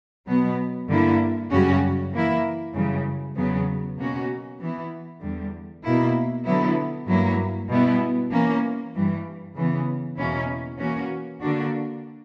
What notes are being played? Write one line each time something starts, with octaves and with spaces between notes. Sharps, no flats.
B2 F#3 B3
G2 D3 A#3 E4
F#2 C#3 G3 C#4 F#4
E3 A#3 E4
F#2 C#3 E3 G3
E2 C#3 F#3 B3
B2 A#3 C#4 F#4
E3 B3 E4
E2 D3 G3
B2 A#3 E4
D3 F#3 B3 E4
G2 F#3 A#3 E4
B2 G3 B3 E4
E3 A#3 C#4
G2 E3 G3
C#3 E3 B3
E2 B2 A#3 C#4 E4
E3 A#3 C#4 F#4
D3 A#3 D4 F#4